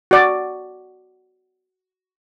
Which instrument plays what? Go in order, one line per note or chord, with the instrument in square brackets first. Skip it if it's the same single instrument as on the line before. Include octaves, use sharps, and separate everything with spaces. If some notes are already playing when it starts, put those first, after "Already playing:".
[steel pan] F#4 D5